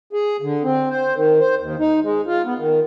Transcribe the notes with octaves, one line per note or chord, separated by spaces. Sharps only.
G#4
D3
C4
C5
D#3
C5
D#2
D#4
G#3
F4
B3
D#3